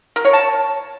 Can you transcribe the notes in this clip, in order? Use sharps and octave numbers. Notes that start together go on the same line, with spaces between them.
A#4
C#5
A5